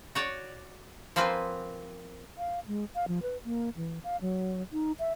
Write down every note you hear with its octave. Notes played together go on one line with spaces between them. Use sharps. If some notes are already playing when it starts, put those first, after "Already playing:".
F#4 C#5 D5
F3 A#3 C4 B4 G#5
F5
G#3
F5
F3
B4
A#3
E3
F5
F#3
D#4
E5